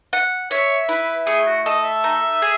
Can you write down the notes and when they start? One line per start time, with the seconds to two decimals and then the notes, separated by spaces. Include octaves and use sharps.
0.13 F#5
0.51 C#5 E5
0.89 E4 B4
1.27 A3 G#4
1.47 F#4
1.65 A4 D#5
1.84 E5
2.04 D#4
2.42 G#4